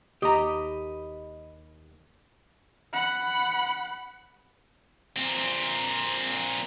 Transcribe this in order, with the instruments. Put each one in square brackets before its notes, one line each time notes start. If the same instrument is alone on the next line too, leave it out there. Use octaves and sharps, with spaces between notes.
[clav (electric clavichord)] D#2 [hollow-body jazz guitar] G4 A#5 [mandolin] D#5 B5
[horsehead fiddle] F#5 B5
[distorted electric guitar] A#2 C4